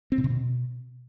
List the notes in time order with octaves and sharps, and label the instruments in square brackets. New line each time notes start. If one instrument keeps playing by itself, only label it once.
[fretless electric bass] C4
B2
C3
B2